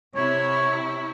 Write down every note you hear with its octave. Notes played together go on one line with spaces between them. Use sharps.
C3 E4 C#5